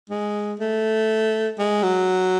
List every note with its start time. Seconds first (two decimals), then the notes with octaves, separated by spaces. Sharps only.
0.09 G#3
0.60 A3
1.59 G#3
1.83 F#3